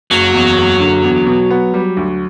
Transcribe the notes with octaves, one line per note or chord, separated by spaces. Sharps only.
F#1 F#3
E2
F#1
D3
E2
B2
B3
G3
D2